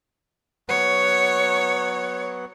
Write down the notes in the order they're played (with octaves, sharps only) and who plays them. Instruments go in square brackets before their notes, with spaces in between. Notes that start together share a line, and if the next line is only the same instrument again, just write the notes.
[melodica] F#3 B3 F#5 [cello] C#5